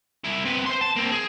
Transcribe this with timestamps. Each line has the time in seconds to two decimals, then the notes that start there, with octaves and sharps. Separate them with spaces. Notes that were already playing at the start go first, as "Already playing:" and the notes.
0.24 C2 E4
0.45 C4 B4
0.66 C5 C6
0.81 A5
0.96 A#3 C4
1.11 G#4